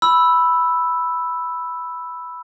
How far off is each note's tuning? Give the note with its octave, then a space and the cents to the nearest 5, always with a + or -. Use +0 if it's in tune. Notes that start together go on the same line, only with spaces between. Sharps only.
B5 +0 E6 +0